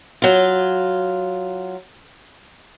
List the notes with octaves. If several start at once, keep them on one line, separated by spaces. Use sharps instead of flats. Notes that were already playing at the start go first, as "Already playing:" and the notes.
F#3 F4